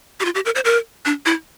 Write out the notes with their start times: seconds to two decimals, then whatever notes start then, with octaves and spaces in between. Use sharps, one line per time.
0.20 G4
0.25 F4
0.35 G4
0.45 A#4
0.55 C5
0.65 A#4
1.05 D4
1.26 E4